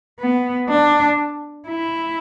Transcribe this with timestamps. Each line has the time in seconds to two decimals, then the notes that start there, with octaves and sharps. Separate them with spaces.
0.20 B3
0.69 D4
1.68 E4